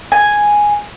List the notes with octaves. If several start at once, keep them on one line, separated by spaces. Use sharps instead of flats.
G#5